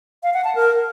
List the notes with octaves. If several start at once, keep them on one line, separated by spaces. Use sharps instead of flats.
F5
F#5
A5
A#4